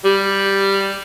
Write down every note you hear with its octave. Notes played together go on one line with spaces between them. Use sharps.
G3